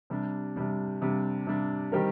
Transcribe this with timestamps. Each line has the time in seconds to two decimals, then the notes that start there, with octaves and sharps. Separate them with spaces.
0.10 C3 G3 D4
0.56 C3 G3 D4
1.02 C3 G3 D4
1.47 C3 G3 D4
1.92 D#3 G3 C4 G4 A#4